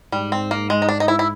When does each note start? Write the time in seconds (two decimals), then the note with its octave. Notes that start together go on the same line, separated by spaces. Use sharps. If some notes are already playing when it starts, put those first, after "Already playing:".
0.12 G#2 G3
0.32 C4
0.51 A#3
0.70 G#3
0.82 D#4
0.89 D4
1.00 D#4
1.08 E4
1.19 E4